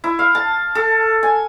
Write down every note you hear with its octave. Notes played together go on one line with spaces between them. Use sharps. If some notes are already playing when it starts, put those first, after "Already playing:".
E4
F5
A5
A4
G#5